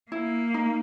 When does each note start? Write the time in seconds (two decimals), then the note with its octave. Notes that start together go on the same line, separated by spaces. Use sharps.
0.11 A#3 E4
0.54 D#4